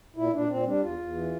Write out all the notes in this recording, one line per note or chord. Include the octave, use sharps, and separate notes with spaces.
A#2 E4
A#2 D4
A#2 C4
G3 D4
E2 F4
E2
E3